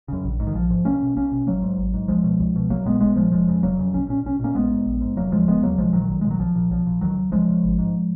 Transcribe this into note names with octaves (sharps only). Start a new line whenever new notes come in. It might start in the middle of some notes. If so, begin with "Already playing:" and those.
F#2 C#3
A#1
G#2
D#3
A#1 F3
G#2
B1 A#3 C#4
B2
B1 A#3 C#4
B2
G#1 F#3 A#3
G#2
G#1
G#2
C#2 F3 G#3
B2
C#2
B2
B1 F#3 A#3
A#2 G#3 B3
B1 G#3 B3
A#2 F3 G#3
F1 F3 G#3
F2 C#3
F1 F#3 A#3
F2 C#3
B1 C#4
A#2 C#4
B1 C#4
A#2 A#3 C#4
A#1 G#3 B3
G#2
A#1
G#2
F1 F#3 A#3
D#2 C#3 F3 G#3
F1 G#3 B3
D#2 C#3 F#3 A#3
B1 F3 G#3
A#2 D#3 F#3
B1
A#2 G#3
F#3
B1 F3
A#2
B1 F3
A#2
C#2 D#3 F#3
C#3
C#2 F3 G#3
C#3
G#1
G#2